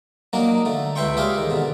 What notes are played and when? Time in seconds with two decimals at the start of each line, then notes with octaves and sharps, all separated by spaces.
0.33 F#3 A#3 D4 D#4
0.65 D3 A3
0.96 C#2 B4 E5 G5 C6 C#6
1.17 G4 G#4 C#5 D5 E5 F5
1.38 D#3
1.50 B2 D3